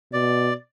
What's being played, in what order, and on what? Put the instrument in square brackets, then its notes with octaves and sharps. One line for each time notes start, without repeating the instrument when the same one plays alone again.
[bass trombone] B2 [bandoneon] D5